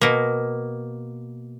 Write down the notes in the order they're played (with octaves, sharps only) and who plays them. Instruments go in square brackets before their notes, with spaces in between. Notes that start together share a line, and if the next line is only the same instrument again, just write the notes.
[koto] B2 A#3